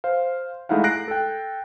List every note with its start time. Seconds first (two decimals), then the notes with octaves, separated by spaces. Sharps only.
0.04 C5 F5
0.69 G#3 A3 D#4 E4 F5 F#5
0.84 F#6 A#6 C7 D7
1.08 A4 G5